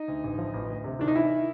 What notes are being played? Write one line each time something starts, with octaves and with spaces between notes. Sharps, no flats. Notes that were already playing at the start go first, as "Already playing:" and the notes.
Already playing: D#4
D2
A1
F3
A1
D2
C3
D#3 D4
D#4
E3 E4